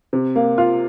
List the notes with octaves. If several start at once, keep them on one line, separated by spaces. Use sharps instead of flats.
C3
A#3
F4